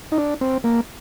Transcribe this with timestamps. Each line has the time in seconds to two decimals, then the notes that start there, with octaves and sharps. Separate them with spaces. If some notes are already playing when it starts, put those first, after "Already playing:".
0.12 D#4
0.18 D4
0.41 C4
0.64 A#3